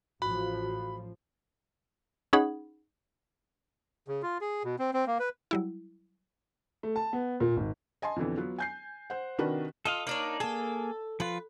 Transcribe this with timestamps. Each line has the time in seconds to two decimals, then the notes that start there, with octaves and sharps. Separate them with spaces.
0.22 A1 F3 F#4 B5
2.33 C#4 D#4 G#4 F#5 B5
4.08 C#3
4.23 F4
4.41 G#4
4.64 B2
4.79 C4
4.94 C4
5.07 A#3
5.19 B4
5.51 F#3 G3 E4
6.83 A3
6.96 A5
7.13 B3
7.40 A#2
7.56 G#1
8.02 D#5 G#5 A5 C6
8.16 F2 B2 D3 E3
8.37 F#3 B3 F4
8.58 G#5 G6 C7
9.10 C5 F#5
9.38 C3 D#3 D4 F#4 A#4 B4
9.85 F4 A4 D#5 F5
10.07 A#3 D4 D#4 C#5 D5
10.40 A#3 G#4 A4
11.20 F3 F4 B4